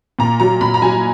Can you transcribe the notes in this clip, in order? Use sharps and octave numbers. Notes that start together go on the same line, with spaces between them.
A#2 A#5
F#3 A#5
A#2 B5
A#5
F#3 G#5